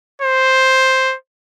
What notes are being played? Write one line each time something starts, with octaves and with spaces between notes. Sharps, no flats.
C5